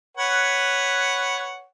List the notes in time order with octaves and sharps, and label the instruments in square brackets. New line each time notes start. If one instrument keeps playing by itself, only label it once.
[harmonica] B4 C#5 F#5